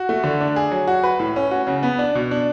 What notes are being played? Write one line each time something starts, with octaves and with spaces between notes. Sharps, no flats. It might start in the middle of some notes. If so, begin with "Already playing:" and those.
Already playing: F#4
A3
D3
D4
G#4
F#3
F#4
B4
A2
C#4
F#4
C#3
B3
D4
B2
D4